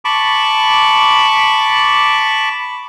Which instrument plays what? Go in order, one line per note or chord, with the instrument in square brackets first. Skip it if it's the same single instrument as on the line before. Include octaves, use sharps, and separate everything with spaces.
[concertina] A5 B5 C#6 D6